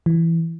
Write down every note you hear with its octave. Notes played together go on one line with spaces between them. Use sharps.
E3